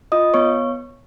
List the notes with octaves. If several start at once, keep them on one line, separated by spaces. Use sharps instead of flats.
F4 D#5 D#6
B3 C#5 C#6